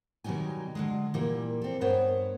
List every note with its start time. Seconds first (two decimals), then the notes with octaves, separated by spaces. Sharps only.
0.24 B2 D#3 F#3 G3 D#4 G#5
0.75 D3 F#3 G#3
1.14 A#2 E3 G3 A#3
1.62 C4 A4
1.81 G2 B3 A#4 C5 C#5